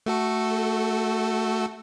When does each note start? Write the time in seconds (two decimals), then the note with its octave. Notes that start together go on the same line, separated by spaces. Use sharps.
0.06 A3 F#4 A4